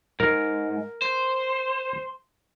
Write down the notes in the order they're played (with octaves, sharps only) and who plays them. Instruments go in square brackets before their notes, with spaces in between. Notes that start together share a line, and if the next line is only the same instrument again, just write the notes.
[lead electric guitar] G#2 [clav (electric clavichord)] A#4
[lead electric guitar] C5 [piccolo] C6